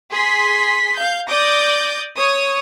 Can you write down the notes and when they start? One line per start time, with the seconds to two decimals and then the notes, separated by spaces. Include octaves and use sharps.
0.11 G#4 C6 B6
0.97 F5 G6
1.28 D5 D6 D#6 G6 A#6
2.17 C#5 D#6